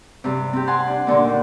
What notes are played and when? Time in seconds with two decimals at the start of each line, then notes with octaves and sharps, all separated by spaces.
0.24 G2 C3
0.53 C4 G4
0.67 F#5 G#5 A5 C6
0.87 D4
1.07 A#2 D3 A#3 C6
1.23 D#3